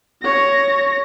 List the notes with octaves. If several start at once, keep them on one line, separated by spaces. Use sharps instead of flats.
C#5 A#6